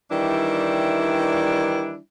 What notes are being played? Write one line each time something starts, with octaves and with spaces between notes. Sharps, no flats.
D#3 E3 G3 D4 E4